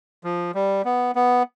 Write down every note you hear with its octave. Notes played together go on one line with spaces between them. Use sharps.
F3
G3
B3
B3